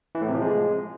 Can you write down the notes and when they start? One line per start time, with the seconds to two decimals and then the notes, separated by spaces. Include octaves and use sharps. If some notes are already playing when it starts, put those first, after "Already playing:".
0.15 E3
0.21 A2
0.28 C3
0.35 F3
0.41 G#3